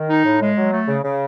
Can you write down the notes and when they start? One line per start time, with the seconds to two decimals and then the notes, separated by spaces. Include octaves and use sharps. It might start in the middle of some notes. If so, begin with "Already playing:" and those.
Already playing: D#3
0.10 D#4
0.24 A2
0.41 G#3
0.57 F#3
0.72 A3
0.88 C#3
1.04 C#3